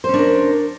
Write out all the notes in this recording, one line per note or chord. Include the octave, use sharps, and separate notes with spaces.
C#4 D4 A#4 C5